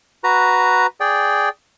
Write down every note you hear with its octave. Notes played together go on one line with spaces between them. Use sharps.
F#4 B4 A#5
G#4 D5 G5